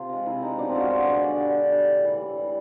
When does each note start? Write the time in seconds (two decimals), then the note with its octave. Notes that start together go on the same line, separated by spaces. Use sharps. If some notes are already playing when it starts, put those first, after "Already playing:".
Already playing: C3 F4
0.09 F3 G#3
0.26 C3 E4
0.42 F3 G#3 D#4
0.58 B2 D4
0.69 C4
0.75 G#3 F4
0.81 F#4
0.90 B2 C5
1.02 C#5
1.07 G#3
1.13 D5
1.23 D3 D5
1.39 G3
1.55 D3
1.72 G3
1.88 A2
2.04 E3 G3
2.20 A2
2.37 E3 G3